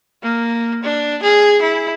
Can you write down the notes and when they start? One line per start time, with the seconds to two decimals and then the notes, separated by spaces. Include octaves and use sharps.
0.23 A#3
0.83 D4
1.23 G#4
1.62 E4